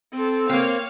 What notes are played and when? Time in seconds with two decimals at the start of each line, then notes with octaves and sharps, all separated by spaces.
0.13 C4 A4
0.49 A#3 C4 C#5 F5